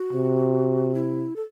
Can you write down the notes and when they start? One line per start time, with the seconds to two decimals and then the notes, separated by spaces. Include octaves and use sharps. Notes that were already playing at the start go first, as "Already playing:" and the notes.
Already playing: F#4
0.13 C3
0.95 E4
1.36 A4